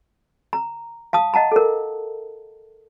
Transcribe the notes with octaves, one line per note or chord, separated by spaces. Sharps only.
A#5
F5 A5 D#6
D#5 F#5 A5 A#5
A4 A#4